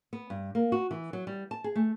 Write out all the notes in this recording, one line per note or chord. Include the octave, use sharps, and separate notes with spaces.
B3
G2
A#3
F#4
E3
F#3
G3
A5
G#4
A3